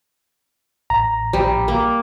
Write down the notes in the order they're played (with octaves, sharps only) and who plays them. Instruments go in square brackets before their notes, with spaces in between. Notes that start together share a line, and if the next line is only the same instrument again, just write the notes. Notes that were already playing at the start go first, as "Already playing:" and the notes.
[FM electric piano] A1 A#5
[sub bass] A#1 [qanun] G3
[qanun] A#3